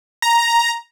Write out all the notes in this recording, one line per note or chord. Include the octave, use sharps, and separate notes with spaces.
A#5